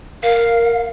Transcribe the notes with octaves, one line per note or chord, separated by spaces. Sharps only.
A#4 F5